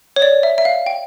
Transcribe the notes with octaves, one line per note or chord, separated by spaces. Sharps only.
C#5
D5
E5
E5
F5
G5